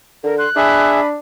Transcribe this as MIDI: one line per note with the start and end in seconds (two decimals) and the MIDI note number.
0.24 0.45 50
0.24 0.35 70
0.38 0.49 84
0.38 0.90 90
0.56 1.18 62
0.56 1.00 68
0.56 1.00 76
0.56 1.07 83